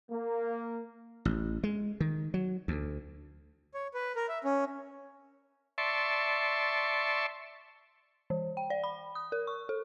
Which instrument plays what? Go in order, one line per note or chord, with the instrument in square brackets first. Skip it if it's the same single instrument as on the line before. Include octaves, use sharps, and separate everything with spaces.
[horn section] A#3
[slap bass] A1
G#3
D#3
F#3
D2
[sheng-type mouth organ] C#5
B4
A#4
E5
C#4
[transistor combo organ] D5 E5 A5 C6 C#6
[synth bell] E3
G5
D5
B5
D#6
A#4
C#6
A4